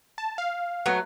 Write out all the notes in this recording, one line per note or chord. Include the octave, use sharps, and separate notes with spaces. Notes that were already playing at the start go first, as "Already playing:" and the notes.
A5
F5
F#3 A3 B3